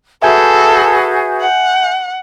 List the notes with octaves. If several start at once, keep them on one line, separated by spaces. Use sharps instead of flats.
F#4 G#4 A4 B4 E5 G#5 G6
F#5